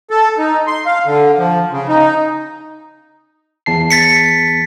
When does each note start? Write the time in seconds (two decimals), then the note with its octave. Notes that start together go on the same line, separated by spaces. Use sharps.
0.11 A4
0.39 D#4
0.67 C6
0.86 F5
1.05 D3
1.38 F3
1.72 C#3
1.89 D#4
3.66 E2 A5 C7
3.90 A6 B6 C#7